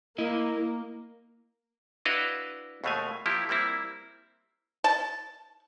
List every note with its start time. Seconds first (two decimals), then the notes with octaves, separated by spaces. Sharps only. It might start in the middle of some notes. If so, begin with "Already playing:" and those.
0.18 A#3 E4 D#5
2.05 D4 E4 F#4 B4 D#5 F5
2.84 D#2 B2 G#3 A3 F5 G#5
3.26 F3 A#3 E4 G4
3.49 G3 A#3 C4 E4
4.84 A5